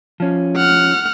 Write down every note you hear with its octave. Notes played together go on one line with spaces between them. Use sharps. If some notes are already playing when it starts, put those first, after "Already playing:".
F3 C#4
F#5 F6